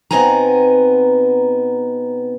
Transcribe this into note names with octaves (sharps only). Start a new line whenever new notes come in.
B2 B3 C4 D#4 G#5 A#5